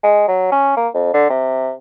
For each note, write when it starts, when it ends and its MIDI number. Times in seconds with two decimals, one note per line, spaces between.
0.03 0.25 56
0.28 0.49 54
0.52 0.74 61
0.77 0.88 58
0.94 1.10 41
1.14 1.26 50
1.30 1.72 48